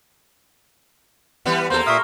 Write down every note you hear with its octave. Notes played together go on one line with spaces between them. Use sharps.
E3 G3 B3
E2 A#3 A4 C5 A#5 C6
A#2 E5 C#6 D#6 F6